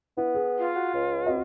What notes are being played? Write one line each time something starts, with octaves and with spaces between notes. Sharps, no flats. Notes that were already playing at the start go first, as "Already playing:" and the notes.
B3 E4
G#4
F4
F#4
C#2
C4 F#4 D#5